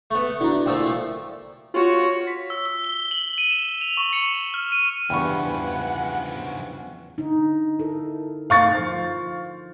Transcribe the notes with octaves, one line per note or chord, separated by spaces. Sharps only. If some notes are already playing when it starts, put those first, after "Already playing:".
A3 B3
D3 E4 F#4 A#5
A#2 F3 A3 G5 E6
F4 F#4 C#5
B6
E6
E6
G7
F#7
D#7
E7
F7
C#6
C#7
F6
D#7
E2 G2 C#3 F3 F#5 G5 B5 C#6
D3 D#4
E4 A4 A#4
F5 C#6 A6
F3 C5